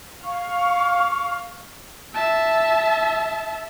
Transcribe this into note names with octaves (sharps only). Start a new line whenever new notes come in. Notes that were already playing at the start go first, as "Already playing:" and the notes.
F5 C#6
E5 A5